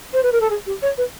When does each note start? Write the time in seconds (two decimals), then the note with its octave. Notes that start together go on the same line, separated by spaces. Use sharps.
0.13 C5
0.22 B4
0.31 A#4
0.40 A4
0.50 G#4
0.66 G4
0.82 C#5
0.97 B4